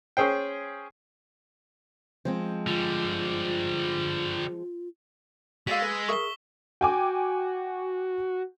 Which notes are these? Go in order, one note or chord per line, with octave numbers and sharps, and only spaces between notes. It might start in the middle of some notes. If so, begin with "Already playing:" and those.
C#4 G#4 C5 G5
F3 G#3 C4
D3 G3 F4
G#3 F#4 D5 F5 E6 B6
B4
G#4 A#4 E5 C#6 G7
F#4 G5 G#5 D6